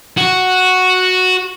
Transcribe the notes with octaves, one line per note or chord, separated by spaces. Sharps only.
F#4